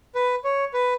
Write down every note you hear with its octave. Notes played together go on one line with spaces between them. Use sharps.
B4
C#5
B4